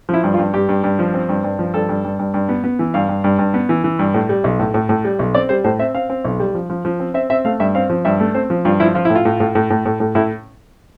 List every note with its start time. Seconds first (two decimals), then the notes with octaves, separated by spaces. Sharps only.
0.09 F3 E4
0.24 G2
0.34 F4
0.38 G2
0.54 G2 G4
0.69 G2
0.84 G2
0.99 F3
1.14 C4
1.29 G2
1.44 G2
1.59 F3
1.74 G2 A4
1.89 G2
2.04 G2
2.19 G2
2.34 G2
2.49 B3
2.64 B3
2.79 E3
2.94 G2 F5
3.09 G2
3.24 G2
3.39 G2
3.54 B3
3.69 E3
3.84 E3
3.99 G2
4.14 A2
4.29 G3
4.44 B1
4.59 A2
4.74 A2
4.89 A2
5.04 G3
5.19 B1
5.34 C4 D5
5.49 G3 C5
5.64 A2 C5
5.79 C4 E5
5.94 C4 F5
6.10 C4
6.25 B1
6.40 G3
6.54 F3
6.70 F3
6.85 F3
7.00 C4
7.14 C4 E5
7.30 C4 E5
7.45 A3 F5
7.60 G2 E5
7.75 C4 F5
7.90 F3
8.05 G2 E5
8.20 A3
8.34 C4 C5
8.50 F3
8.65 G2 F4
8.80 F3 E4
8.95 F3 F4
9.05 A2 E4
9.15 F4
9.25 A2
9.40 A2
9.55 A2
9.70 A2
9.86 A2
10.00 A2
10.15 A2 E4